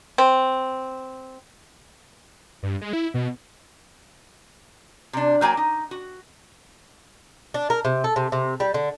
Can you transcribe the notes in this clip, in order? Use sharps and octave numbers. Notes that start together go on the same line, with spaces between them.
C4
G2
G#3
E4
B2
C3 D4
F#3 A#3 G5 G#5
D#4
F#4
D4
A#4
C3
A4
C3
C3
G3
D3